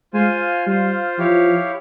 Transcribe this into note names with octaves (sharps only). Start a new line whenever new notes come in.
G#3 F4 C5 F5 G#5
G3 F4 C5 F5
F3 E4 G4 C#5 F5